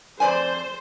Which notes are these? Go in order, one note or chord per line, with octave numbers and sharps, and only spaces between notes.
F2 C5 D5 G#5